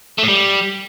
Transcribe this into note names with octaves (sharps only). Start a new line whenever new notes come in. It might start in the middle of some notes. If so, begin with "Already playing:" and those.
A3
A2
G3